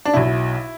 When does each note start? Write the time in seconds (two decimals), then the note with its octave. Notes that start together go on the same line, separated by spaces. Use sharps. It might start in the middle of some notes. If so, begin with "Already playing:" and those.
0.05 D4
0.13 B1 B2 E4